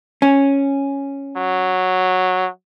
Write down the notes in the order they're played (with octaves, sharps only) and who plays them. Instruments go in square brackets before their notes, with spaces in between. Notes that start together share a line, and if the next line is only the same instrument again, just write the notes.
[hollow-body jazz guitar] C#4
[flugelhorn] F#3